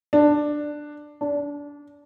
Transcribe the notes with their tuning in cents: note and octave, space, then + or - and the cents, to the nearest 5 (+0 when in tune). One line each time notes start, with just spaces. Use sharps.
D4 +10
D4 -25